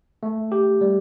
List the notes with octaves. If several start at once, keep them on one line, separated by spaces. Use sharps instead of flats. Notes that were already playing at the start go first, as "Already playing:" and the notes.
A3
G4
G3